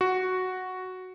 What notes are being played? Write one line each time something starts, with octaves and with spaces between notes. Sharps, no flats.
F#4